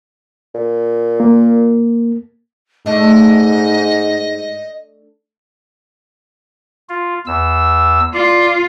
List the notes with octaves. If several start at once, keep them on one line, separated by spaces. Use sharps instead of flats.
A#2
A#3
G#2 A3 D4 D#5
F4
E2 E6
F4 D5